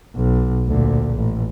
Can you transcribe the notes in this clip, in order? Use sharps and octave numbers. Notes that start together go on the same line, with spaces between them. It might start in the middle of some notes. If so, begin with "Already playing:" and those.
B1
D2 A#2
A1